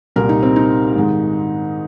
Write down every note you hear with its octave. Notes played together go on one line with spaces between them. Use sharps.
C2 A#2 G3 A#4
D#4
C4
D#4
G#2 D#3 G#3